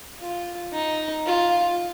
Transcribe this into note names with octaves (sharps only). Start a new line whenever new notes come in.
F4
D#4
F4